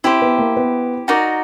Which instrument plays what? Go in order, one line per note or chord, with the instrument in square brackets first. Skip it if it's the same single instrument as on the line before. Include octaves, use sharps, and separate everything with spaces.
[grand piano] C4 [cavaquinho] E4 G4 C5
[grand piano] B3
A#3
B3
[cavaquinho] D#4 F#4 A#4 D5